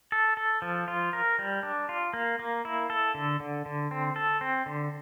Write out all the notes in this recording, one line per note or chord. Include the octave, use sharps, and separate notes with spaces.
A4
A4
F3
F4
A#4
G3
D4
F4
A#3
A#3
E4
A4
D3
D3
D3
C4
A4
C4
D3